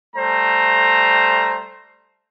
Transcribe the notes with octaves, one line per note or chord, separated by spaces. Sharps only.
G3 A3 C5 A#5